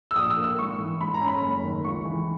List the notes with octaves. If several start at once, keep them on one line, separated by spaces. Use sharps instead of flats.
E6
A#1 D#6
E6
A#3
E6
G#1 C#6
E3
G#2 B5
A#5
C#4
B5
F#1
D#3
C#2 C#6
E3